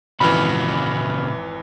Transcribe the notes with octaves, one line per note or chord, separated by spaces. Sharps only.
G#1 F2 A#2 C#3 E3 F#4 B5 F6